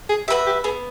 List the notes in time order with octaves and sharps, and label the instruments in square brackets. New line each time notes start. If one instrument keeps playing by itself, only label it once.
[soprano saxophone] G#4
[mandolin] F#4 B4 E5 [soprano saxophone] G4
[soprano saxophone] G4
[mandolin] B3 [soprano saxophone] G#4